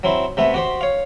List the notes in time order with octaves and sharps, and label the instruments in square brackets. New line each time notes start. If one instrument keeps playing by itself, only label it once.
[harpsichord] F#3 C4 E4
C3 A3 B3 E5
F#4 G4 C5
C#5 F5